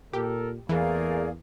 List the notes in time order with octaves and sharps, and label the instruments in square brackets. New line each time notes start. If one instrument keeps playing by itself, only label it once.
[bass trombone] A#2 [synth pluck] G4 [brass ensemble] A4 A#4
[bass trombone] E2 [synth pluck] E3 [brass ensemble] A3 A#3 A#4 [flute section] G#4 D5 F5